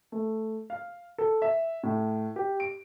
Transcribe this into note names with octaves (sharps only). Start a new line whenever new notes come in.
A3
F5
A4
E5
A2
G4
D7